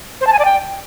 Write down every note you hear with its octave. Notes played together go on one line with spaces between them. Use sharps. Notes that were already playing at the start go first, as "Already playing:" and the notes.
C5
A5
G#5
D5
G5